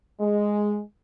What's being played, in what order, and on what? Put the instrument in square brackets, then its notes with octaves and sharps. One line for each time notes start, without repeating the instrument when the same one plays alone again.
[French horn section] G#3